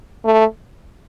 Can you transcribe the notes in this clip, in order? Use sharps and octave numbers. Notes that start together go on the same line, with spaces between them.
A3